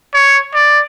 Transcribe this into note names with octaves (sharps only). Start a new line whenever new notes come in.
C#5
D5